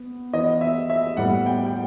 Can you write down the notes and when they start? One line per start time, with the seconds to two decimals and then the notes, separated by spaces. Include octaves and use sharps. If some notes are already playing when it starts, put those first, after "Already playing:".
Already playing: B3
0.33 E3 B3 D#5
0.61 E5
0.90 E5
1.17 A2 G3 B3 F#5
1.46 G5
1.66 G5